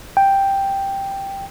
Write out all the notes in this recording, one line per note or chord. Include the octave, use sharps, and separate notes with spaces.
G5